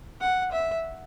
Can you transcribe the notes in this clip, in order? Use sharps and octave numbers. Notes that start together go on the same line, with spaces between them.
F#5
E5